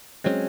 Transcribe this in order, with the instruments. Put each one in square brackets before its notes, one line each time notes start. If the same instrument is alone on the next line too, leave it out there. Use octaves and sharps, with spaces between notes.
[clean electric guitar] F#3 C#4 [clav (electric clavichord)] G#3 C4